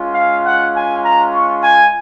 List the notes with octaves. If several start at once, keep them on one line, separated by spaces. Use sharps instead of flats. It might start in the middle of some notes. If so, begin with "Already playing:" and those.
Already playing: G#3 C#4 F4
F5
F#5
G#5
A#5
C#6
G#5